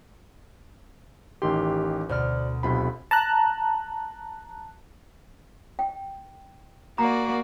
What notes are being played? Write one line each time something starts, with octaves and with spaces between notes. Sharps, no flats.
A1 D#3 G4 C6
D2 B2 C5 D5 F6
B1 C3 B3 F4 B5
A5 A#5 F#6
G5
A#3 F#4 D5 A#5